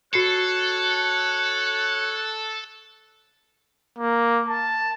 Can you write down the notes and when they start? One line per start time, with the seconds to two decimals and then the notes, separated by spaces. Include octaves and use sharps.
0.14 F#4 A4 C#5 F#6 C7 C#7
3.99 A#3
4.48 A5